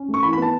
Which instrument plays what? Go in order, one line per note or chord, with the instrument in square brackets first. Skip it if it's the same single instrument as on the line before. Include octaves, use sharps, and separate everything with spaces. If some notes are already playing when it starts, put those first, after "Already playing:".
Already playing: [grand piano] C#4
A3
C#6
E3 B5
B5
B3
A5